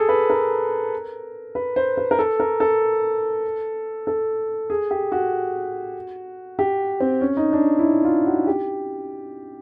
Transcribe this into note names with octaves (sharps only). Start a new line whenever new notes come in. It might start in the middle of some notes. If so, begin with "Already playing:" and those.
Already playing: G#4 A4
B4
A#4
B4
C5
B4
A#4
A4
A#4
A4
A4
G#4
G4
F#4
G4
C4
C#4
D#4
D4
E4
D#4
F4
F#4
G4